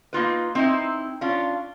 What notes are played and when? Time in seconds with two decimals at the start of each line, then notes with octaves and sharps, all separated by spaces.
0.13 A#3 D#4 F4 B4
0.55 C4 D#4 E4
1.21 C#4 D4 F4